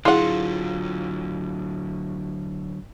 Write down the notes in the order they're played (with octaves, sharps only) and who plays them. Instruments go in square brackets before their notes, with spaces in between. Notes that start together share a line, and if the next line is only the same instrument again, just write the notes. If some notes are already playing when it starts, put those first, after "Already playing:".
[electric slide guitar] D3 F#3 [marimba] E4 G#4 [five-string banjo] F4 F#5